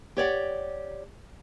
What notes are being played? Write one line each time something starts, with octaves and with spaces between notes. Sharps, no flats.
G4 C#5 D5 F#5